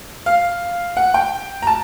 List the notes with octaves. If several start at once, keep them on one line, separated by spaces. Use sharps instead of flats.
F5
F#5
G5
A#5
A5